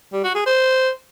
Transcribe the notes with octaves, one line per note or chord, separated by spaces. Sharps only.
G3
F#4
G#4
C5